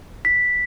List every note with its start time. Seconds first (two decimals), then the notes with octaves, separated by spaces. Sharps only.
0.25 B6